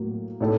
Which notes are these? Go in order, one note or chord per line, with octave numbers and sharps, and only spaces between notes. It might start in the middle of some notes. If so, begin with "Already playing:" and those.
Already playing: A2 F#3 A#3
A2 A3 D#4 A4 C#5